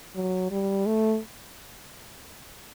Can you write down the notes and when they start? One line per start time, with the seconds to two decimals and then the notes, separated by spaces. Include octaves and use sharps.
0.15 F#3
0.51 G3
0.86 A3